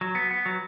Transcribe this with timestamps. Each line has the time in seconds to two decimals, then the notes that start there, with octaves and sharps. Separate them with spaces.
0.01 F#3
0.15 B3
0.31 B3
0.46 F#3